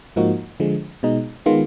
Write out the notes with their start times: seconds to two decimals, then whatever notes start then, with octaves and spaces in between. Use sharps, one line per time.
0.16 G#2 F3 A#3 D#4 F#4
0.60 D3 F3 G#3
1.03 B2 G#3 D#4
1.46 D#3 G#3 B3 F4